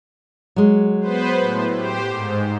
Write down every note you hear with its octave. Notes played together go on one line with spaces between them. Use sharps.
F#3 G#3
B3 B4 C5
A2
G4 C5
G#2